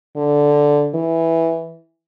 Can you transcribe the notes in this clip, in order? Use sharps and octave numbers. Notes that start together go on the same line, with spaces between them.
D3
E3